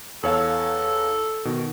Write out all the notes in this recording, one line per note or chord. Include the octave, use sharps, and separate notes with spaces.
E2 A4 C#5 F5
B2 D#3